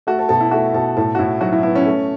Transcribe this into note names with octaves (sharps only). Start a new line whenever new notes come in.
A3 F#4
A4
B2 A4
E4
A3 F#4
B2 A4
A2 A4
F#4
A2 E4
F#3 F#4
E4
B3 E4
C#4
A3